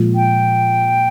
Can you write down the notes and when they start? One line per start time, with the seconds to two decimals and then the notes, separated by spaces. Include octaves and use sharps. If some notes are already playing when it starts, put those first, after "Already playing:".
Already playing: A#2 F3 G#3
0.15 G5